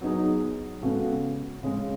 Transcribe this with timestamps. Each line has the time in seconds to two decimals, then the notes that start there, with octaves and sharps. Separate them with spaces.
0.01 F#3 B3 D#4 G#4
0.82 C#3 G#3 B3 F#4 A4
1.63 C#3 G#3 C#4